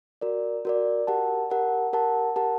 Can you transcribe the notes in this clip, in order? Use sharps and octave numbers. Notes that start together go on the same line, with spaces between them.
F#4 A#4 D5
F#4 A#4 D5
G4 A#4 F#5 A5
G4 A#4 F#5 A5
G4 A#4 F#5 A5
G4 A#4 F#5 A5